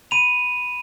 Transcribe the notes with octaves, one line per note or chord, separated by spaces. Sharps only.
B5 D#7 F7